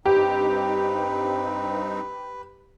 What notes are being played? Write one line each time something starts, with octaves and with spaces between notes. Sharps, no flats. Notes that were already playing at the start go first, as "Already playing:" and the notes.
G2 C4 D#4 G4 B4